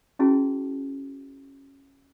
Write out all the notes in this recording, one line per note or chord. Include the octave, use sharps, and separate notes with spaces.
C#4 E4 F#4 G#4 A5